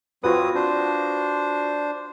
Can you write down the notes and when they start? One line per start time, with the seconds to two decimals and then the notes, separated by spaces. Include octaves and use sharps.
0.24 F#3 C4 F4 F#4 B4 D#6
0.55 D4 C5